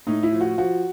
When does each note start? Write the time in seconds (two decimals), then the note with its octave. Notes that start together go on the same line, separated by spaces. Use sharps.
0.07 A2 D#4
0.23 E4
0.32 F3
0.41 F#4
0.58 F3 F#4